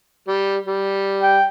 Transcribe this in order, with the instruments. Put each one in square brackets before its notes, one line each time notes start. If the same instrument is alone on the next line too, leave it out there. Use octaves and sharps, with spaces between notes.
[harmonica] G3
G3
[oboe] G5